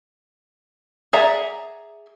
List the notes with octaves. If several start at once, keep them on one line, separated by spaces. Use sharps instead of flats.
G#4 D5 E5 F#5 A#5